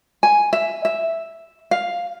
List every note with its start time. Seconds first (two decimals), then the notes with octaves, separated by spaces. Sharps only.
0.23 G#5
0.53 E5
0.85 E5
1.71 F5